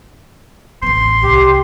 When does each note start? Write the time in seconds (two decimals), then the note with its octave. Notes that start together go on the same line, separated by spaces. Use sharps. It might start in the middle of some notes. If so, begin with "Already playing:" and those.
0.83 A1 B3 C6
1.23 C2 G4